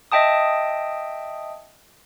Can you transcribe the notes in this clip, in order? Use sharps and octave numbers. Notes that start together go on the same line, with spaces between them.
D#5 E5 G5 A5 D#6